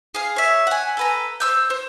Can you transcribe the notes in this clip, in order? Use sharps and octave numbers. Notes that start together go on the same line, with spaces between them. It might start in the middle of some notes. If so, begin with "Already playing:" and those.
G#4 F5
C#5 E5
F#5 G#5
A4 B4 A#5
C5 E6 G6
C5